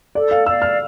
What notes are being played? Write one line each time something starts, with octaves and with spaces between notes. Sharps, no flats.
A4 D5
F5
D5 F5 E6
F6